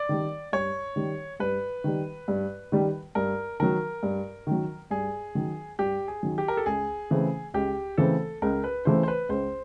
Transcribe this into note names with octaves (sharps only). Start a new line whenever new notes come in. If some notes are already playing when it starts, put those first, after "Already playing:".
Already playing: D5
D#3 G3
G2 C#5
D#3 G3
G2 B4
D#3 G3
G2
D#3 G3
G2 A#4
D#3 F#3 A#4
G2
D#3 F#3
G2 G#4
D#3 F#3
G2 G4
G#4
D#3 F#3
G4
A#4
A4
C#2 G#4
C#3 E3 A3 C4
C#2 G4
C#3 E3 A3 C4 A4
C#2 A#4
B4
C#3 E3 A3 C4 C5
C5
B4
C#2 C5